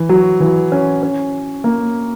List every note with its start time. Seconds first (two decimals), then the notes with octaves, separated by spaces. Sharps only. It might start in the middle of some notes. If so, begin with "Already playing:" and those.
Already playing: E3
0.09 F#3
0.40 E3
0.72 C#4
1.03 C#4
1.64 A#3